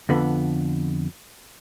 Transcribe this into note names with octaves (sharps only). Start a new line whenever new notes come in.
F2 D3 B3